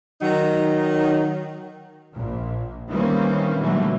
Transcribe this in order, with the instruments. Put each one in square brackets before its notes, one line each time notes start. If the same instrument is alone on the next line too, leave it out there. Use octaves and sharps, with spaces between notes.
[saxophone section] D#3 F#3 D#4
[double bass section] A#1 A#2
D#3 E3 G3 A#3 C4 C#4
A#2 D3 E3 F#3 G3 A3